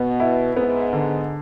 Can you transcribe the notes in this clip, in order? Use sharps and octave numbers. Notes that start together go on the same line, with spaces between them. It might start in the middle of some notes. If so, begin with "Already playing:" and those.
Already playing: B2 B3
E4
G#2 B3
D3